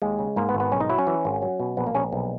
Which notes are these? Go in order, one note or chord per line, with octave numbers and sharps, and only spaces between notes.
D#2 G#3
C#3
G#2 A#3
B3
G#1
B3
B1 C#4
D#4
F#3 E4
C#4
E3
G#1
F#3
B2
A#1 B3
A#3
A#1 C#4
B1